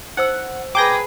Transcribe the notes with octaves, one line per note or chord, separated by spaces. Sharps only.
D#4 C5 F#5 E6
G#4 B4 G5 A#5 D6 G6 G#6 A#6